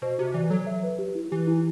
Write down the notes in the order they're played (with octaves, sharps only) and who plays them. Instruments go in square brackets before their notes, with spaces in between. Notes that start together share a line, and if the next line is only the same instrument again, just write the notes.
[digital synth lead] B2 [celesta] C5
[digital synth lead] C3 [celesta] F#4
[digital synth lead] E3 [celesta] D5
[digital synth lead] F#3 [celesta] A4
[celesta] E5
B4
G4
E4
[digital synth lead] E3 [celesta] G4
[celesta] E4